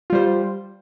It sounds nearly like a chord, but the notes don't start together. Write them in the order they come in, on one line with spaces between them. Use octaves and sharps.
F4 G3 C5